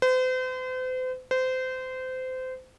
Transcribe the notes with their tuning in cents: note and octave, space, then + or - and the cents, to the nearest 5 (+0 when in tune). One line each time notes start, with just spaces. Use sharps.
C5 -40
C5 -25